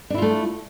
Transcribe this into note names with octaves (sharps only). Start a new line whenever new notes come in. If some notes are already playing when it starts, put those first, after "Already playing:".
A3 D4 E4 F4